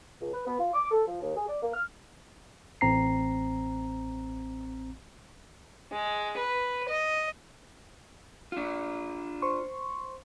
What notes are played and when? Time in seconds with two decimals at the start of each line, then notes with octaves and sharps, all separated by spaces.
0.21 C#2
0.33 B4
0.47 B3
0.60 F4
0.74 D6
0.91 A4
1.08 F3
1.22 D#2
1.37 G#4
1.48 D5
1.63 A#3
1.74 F6
2.81 A1 C4 A#5 C7
5.92 G#3
6.37 B4
6.88 D#5
8.52 D4 F4
9.42 C5 C6 C#6